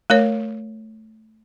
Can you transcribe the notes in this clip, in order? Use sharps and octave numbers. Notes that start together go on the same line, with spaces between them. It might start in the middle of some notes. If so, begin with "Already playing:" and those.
A3 A#4 C#5